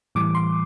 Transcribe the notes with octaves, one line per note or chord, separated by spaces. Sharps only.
A2 E3 G3 D6
C6